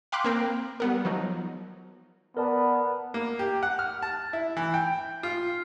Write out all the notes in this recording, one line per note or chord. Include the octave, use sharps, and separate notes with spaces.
F5 G5 B5 C6 D6 F#6
A#3 C4 A#4 G5
G3 B3 A#4
F3 F#3 D#4
B3 A#4 D5 A5
A#3
G4
F#5
F6
A5
E4
E3
G5
F4